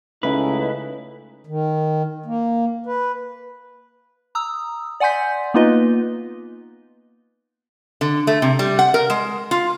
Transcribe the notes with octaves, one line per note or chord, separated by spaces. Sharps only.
C#2 A3 C#4 D#4 E4 B4
D#3
A#3
B4
A#5 D#6 E6
D5 F#5 G#5 C6 G6 B6
A#3 B3 D#4 F4 B4 D#5
D3
A3
C3
G3
F#5
A#4
G#3
F4